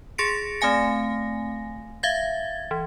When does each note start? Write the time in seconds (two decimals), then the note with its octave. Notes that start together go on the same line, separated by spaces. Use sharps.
0.18 G#4 C6 A6 A#6 C#7 D7
0.61 A3 C4 F5 G#5 A#6
2.03 E5 F5 G#6 A6
2.71 E3